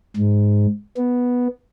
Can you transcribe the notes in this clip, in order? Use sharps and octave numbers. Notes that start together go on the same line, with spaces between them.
G#2
B3